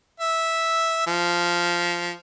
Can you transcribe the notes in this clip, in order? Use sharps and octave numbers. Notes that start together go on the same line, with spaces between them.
E5
F3